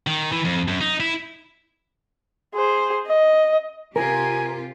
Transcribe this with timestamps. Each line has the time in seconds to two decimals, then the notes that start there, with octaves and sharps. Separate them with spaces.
0.07 D#3
0.32 E3
0.45 F2
0.68 F#2
0.81 D#4
1.00 E4
2.54 G#4 C5
3.06 D#5
3.96 C3 F4 G4 A#4 G#5